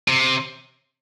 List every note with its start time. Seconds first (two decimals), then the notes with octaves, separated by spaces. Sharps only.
0.08 C3